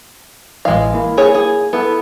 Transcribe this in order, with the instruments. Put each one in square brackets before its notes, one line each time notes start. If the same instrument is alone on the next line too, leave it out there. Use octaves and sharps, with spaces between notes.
[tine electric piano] A1 E3 D#5 [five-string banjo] G#3 F5
[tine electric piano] A#3 E4
[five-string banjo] G#4 C#5
G#4
[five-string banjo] B3 [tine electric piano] E4 A4